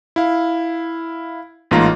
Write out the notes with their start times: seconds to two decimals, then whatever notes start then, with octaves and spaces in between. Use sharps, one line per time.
0.16 E4 F5
1.71 A1 G#2 A#3 F4 A#5